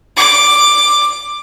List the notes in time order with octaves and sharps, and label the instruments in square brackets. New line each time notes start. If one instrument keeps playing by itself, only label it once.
[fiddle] D6